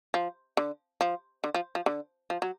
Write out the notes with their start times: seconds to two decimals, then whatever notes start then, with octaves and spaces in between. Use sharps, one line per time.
0.14 F3
0.57 D3
1.01 F3
1.44 D3
1.54 F3
1.75 F3
1.86 D3
2.30 F3
2.42 F#3